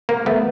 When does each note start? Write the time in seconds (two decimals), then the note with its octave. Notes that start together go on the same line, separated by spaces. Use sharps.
0.09 A#3
0.26 A3 B3